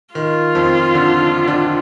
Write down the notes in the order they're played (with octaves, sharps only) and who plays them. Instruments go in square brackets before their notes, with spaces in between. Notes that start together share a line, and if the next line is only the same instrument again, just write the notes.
[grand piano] D#3 [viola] F4
[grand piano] F2 F3
D3 D4
D3 D4
D3 D4